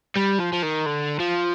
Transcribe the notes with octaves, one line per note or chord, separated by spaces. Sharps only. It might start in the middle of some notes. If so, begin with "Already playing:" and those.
G3
F3
F3
D#3
D3
F3